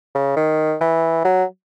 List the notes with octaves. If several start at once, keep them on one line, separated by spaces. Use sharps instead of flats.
C#3
D#3
E3
F#3